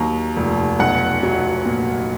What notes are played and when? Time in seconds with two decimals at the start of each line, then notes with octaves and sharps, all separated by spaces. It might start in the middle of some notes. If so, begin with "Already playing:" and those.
Already playing: D#2 F#3 A#5
0.37 F1
0.80 B1 F#5
1.23 F#3
1.65 A#2